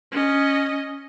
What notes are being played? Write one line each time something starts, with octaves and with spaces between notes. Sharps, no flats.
C#4 D#5